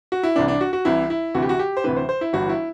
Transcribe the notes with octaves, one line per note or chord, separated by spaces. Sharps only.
F#4
E4
C2 C3 E3 D4
D4
F#4
F#4
C2 C3 E3 E4
E4
D2 C3 E3 F#4
G4
F#4
G4
C5
D2 C3 E3 B4
C5
C5
E4
G1 G2 E3 F#4
E4